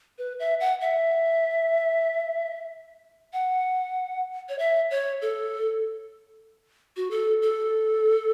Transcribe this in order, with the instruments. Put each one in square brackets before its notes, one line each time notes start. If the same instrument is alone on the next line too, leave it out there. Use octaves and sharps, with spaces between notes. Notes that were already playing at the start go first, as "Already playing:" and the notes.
[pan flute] B4
E5
F#5
E5
F#5
C#5
E5
C#5
A4
F#4
A4
A4